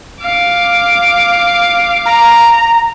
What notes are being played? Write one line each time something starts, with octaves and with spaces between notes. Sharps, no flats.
F5 D6
A#5